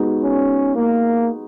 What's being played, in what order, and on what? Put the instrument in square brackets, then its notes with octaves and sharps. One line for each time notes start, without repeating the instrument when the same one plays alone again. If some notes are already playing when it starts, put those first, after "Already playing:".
Already playing: [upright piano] G#3 B3 D#4 F#4
[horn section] C#4
A#3